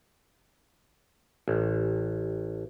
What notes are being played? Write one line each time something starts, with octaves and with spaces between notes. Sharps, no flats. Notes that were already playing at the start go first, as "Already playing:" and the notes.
A1